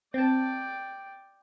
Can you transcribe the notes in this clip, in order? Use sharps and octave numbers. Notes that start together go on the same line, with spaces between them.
C4 D5 G5 A5